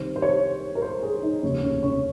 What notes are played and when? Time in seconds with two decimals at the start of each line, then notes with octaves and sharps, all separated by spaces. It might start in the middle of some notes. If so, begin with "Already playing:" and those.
Already playing: C2 C3 D#3 C5
0.16 C5
0.22 C#5
0.75 A#4
0.82 C5
1.02 G#4
1.22 D#4
1.42 F1 D#2 C#3 C#4
1.63 C#4
1.83 C#4